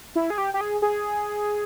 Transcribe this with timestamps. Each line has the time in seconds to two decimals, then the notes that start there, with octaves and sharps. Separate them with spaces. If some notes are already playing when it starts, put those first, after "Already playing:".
0.16 E4
0.30 G#4
0.38 G4
0.54 G4
0.61 G#4
0.82 G#4